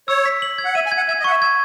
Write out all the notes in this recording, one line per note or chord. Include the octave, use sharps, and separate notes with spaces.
C#5 E6
B6
F#7
G#6
F#5
E5 D#7
G#5
G#6
F#5
E5 G#6
D#5
F#5 C#6
E5
E5 G#6